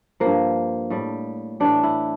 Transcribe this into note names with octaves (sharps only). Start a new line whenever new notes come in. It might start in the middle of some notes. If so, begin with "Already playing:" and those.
G2 F3 A#3
A2 G3
A2 E3 G3 D4
E4